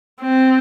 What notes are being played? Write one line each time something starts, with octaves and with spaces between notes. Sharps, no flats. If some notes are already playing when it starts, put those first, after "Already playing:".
C4